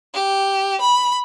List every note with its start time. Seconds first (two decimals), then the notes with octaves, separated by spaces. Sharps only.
0.14 G4
0.81 B5